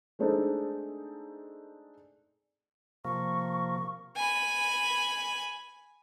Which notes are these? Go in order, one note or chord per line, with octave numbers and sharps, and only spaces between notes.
G#3 A3 C4 D4 D#4 A4
C3 F3 A#3 C#6
G#5 B5